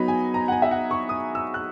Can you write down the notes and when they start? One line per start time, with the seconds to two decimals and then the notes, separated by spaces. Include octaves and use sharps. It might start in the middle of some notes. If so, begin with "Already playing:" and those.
Already playing: F#3 B3 D#4 B5
0.08 G#5
0.34 A#5
0.48 F#5
0.52 G#5
0.62 E5
0.71 F#5
0.91 C#6
1.09 D#6
1.35 E6
1.54 F#6